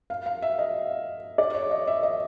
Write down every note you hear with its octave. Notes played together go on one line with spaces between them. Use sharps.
F5
F5
E5
D#5
D5
C#5
D#5
E5
D#5